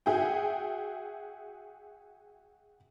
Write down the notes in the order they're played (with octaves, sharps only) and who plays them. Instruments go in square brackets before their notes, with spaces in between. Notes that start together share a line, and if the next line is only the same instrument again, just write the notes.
[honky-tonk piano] F#4 G#4 E5 G5